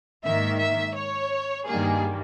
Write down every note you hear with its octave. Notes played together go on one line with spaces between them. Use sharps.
G#2 D#3 A#3 E5
E5
C#5
G2 D#3 G3 A#3 G#4